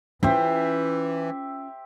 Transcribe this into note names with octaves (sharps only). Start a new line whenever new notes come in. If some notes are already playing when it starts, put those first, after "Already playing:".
E3 C#4 F4 G4 C5 E5